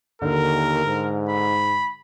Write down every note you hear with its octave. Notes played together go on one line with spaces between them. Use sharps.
D#2 D3 A#4
G#2
B5